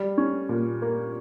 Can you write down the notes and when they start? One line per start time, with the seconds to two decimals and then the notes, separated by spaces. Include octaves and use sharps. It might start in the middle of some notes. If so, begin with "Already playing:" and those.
Already playing: G3
0.18 C#4
0.49 A#2
0.82 A#3